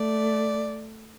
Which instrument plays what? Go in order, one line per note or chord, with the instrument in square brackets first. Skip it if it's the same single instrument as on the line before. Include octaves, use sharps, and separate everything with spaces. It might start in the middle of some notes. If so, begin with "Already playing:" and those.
Already playing: [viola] A3 [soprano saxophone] D5